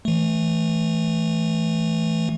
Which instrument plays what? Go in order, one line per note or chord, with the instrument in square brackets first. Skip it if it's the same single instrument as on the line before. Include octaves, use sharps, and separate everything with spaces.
[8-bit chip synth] E3 A3